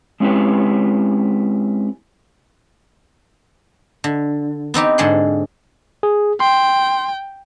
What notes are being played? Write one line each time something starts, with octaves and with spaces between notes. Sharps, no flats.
G#3 C4 C#4 E4 G4 B4
D3
B3 C4 D#4 G4
G#2 D3 G#4 F#5 C6
G#4
G5 C6